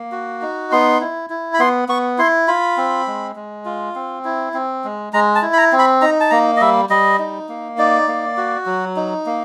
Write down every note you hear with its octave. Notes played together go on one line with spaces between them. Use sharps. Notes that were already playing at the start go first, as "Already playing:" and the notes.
Already playing: A#3
F#4
D#4
B3 C6
E4
E4
B5
B3 C6
B3 C#6
E4 C6
F4 B5
C4
G#3
G#3
F4
C4
E4
C4
G#3
G#3 A#5
A5
E4
B5
A#5
C4
B5
D#4 A#5
A5
A#3 A#5
D#5
G3 E5
G3 D#5
D#4
A#3
D#4 D5
A#3
F#4
F#3
D#4
A#3